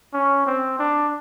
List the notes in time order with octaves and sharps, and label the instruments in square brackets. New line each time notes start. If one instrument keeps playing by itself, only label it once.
[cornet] C#4
C4
D4